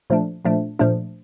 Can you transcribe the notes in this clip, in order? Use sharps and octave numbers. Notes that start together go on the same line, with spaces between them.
A#2 F3 A3 D4
A#2 F3 A3 D4
A#2 F3 A3 D4